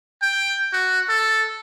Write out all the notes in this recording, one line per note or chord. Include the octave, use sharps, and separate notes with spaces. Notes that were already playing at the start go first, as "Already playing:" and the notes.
G5
F#4
A4